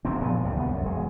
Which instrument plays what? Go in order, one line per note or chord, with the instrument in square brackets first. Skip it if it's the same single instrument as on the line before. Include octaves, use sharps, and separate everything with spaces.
[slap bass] F#1 F#2 F#3 C4
A#2 F3 B3
D2 G2 C3
C2 B3
F#2
E1 G#3